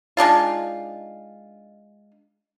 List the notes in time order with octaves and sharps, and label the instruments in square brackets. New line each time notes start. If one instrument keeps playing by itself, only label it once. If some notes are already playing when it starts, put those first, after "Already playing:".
[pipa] G#3 D4 D#4 F4